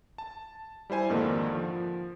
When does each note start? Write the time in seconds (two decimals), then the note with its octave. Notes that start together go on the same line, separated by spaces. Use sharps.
0.18 A5
0.90 G3 E4 C5 G#5
1.09 F2 G#2 D3 D#3 A#3
1.55 F3